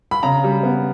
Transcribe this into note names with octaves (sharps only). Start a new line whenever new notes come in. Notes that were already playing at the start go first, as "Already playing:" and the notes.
B5
C#3 A#5
G3
B3